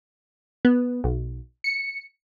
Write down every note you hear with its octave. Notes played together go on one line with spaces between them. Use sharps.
B3
B1
C#7